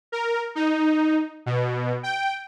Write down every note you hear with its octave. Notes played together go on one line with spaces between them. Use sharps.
A#4
D#4
B2
G5